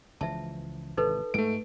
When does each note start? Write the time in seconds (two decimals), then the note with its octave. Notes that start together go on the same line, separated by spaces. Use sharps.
0.21 C#2 E3 F3 E5 A5
0.97 G#1 C3 E3 D#4 A4 B4
1.34 G#2 G#3 A3 D7